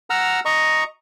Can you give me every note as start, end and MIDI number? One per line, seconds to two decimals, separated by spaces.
0.10 0.40 78
0.10 0.40 82
0.10 0.40 88
0.10 0.40 89
0.45 0.84 75
0.45 0.84 82
0.45 0.84 85